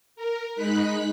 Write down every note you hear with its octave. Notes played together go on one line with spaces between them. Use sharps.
A#4
G#3 D#4 B5 F#6 B6